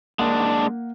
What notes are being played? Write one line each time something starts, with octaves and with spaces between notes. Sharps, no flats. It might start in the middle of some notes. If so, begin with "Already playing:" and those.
G#3 A#3 D4 F#5